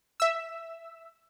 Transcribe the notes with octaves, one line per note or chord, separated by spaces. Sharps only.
E5 E6